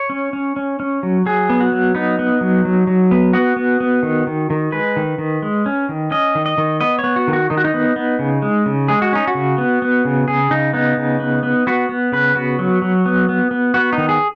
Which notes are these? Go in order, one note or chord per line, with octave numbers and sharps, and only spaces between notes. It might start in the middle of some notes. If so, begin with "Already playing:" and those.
Already playing: C#5
C#4
C#4
C#4
C#4
F#3
F#3 G#4
B3
F#4
F#3
B3 D#4
B3
F#3
F#3
F#3
B3
B3 F#4
B3
B3
D#3
D#3
D#3
G#3 B4
D#3
D#3
G#3
C#4
D#3
C#4 D#5
D#3
D#5
D#3
B3 D#5
B3 C#5
F#4
D#3
F#4
D#3 D#4
F#4
D#4
B3
B3
C#3
G#3
C#3
G#3 G#4
F#4
C#4 D#4
F#4
C#3
B3
B3
C#3
C#3 G#4
C#3 D#4
B3 D#4
C#3
B3
B3
B3 F#4
B3
C#3 B4
B3 F#4
F#3
F#3
B3
B3
B3
B3 F#4
D#4
D#3
G#4